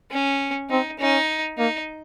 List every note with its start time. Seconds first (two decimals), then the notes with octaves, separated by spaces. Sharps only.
0.11 C#4
0.70 C4 D#4
1.00 C#4 D#4
1.58 A#3 D#4